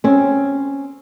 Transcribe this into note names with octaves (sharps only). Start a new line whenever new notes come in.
C4 C#4